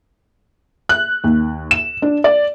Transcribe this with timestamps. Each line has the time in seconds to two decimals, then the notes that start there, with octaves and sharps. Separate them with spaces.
0.89 F#6
1.24 D#2
1.71 E7
2.02 D4
2.24 D5